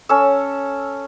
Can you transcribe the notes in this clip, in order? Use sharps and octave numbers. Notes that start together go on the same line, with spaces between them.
C#4 A4 E6